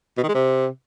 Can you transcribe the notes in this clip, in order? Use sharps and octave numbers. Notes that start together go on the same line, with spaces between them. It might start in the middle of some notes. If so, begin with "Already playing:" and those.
B2
D#3
G#3
C3